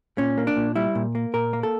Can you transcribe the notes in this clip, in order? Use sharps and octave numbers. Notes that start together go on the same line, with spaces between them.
A#2 C#4
A#3
D4
A#2
G3 E4
A#2
A#3
A#2 A#4
A#3
A4